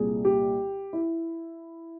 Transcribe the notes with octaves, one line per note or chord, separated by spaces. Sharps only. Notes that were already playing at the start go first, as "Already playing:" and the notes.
Already playing: C2 A#2 G3 G#4
G4
E4